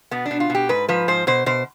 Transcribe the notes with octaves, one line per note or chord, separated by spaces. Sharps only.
B2 B3
D4
B2
F4
B2 G4
G#2 B4
F3 B4
G#2 C5
B2 C5
B2 C5